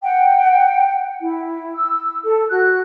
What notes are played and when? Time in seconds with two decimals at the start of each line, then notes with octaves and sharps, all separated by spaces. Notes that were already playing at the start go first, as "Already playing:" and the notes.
0.02 F#5 G5
1.20 E4
1.75 E6
2.23 A4
2.50 F#4 F#6